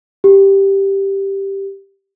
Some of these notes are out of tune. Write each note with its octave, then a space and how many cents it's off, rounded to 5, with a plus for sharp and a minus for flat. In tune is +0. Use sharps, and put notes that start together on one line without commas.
G4 +0